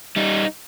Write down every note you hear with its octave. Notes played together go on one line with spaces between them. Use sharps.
G3 D#4